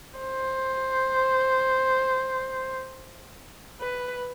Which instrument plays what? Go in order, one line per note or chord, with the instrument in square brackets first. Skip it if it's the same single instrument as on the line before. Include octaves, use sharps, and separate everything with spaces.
[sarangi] C5
B4